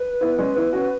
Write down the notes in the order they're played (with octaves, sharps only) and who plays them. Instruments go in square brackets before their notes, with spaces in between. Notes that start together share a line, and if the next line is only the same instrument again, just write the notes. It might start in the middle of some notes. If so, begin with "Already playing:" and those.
Already playing: [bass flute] B4
[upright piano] B3 E4
G#3 C#4
B3 E4
C#4 F#4